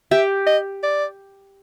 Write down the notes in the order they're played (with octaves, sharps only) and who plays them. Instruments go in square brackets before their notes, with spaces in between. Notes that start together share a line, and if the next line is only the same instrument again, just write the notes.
[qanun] G4 [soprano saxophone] E5
[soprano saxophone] D#5
D5